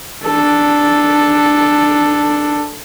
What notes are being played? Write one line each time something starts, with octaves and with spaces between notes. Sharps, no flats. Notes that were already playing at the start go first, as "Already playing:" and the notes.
D4 A4